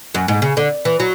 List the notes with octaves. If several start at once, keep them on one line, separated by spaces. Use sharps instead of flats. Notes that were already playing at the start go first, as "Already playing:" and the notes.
F#2
G#2
C#3
D3
E3
F#3